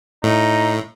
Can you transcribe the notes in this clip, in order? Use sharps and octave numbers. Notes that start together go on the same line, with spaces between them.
A2 D#4